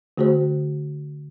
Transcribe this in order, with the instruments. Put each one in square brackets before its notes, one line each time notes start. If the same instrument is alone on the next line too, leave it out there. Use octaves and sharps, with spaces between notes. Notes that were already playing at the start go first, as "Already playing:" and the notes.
[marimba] D3 A3 F#4 G#4 C5